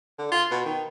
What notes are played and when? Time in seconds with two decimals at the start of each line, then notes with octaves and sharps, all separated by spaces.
0.18 D3
0.32 F4
0.51 B2
0.65 D#3